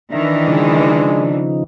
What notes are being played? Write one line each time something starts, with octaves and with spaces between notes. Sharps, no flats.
D#3 E3 D4 E5 A#5
C#3 F3 G#3 D#4